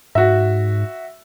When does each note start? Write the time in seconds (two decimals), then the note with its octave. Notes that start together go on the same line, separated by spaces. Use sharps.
0.15 G#2 F#4 E5